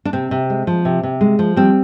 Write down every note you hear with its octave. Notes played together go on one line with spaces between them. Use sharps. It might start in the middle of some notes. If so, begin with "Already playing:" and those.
D4
C3 C4
C3
G#3
F3
C3
C3
G#3
F3
G3 C4